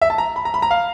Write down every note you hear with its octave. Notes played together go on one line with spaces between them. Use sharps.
E5
A5
A#5
B5
A#5
B5
A#5
F5